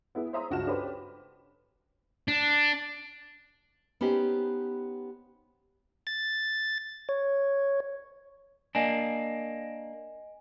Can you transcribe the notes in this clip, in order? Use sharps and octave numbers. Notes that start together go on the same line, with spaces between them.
B3 E4 G#4
C5 C#5 E5 A#5 C6 D#6
C#2 G2 F#4 A5 F6 E7
C#4 D4 G4 A4 B4 C5
D4
B3 C#4 D#4 G4 C5
A6
C#5
A#3 D4 D#5 G#5